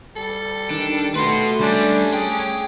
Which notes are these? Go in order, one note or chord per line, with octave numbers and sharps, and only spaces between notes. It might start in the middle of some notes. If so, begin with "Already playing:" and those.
G3 A4
D#3 D4
A3 F#4 B4 C6
G3 C#4 D4
G#4 G5